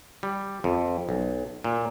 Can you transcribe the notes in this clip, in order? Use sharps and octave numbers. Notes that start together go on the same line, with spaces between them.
G3
F2
B1
A#2